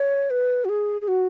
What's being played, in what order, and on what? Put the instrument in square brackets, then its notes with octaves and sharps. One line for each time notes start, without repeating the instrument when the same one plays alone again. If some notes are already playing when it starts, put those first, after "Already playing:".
Already playing: [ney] C#5
B4
F#4
G#4
G#4
F#4